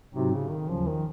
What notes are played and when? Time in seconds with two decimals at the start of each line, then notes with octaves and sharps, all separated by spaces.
0.14 G#2 C3 F#3 C4 D#4 F#4
0.32 C#3
0.51 D#3
0.69 D#2 C#3 F3 F#3 C#4
0.87 D#3